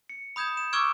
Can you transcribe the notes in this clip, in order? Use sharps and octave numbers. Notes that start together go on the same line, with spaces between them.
C#7
B5 D#6 G6 G#6 E7
E7
C#6 D6 E6 F6 G#6 D7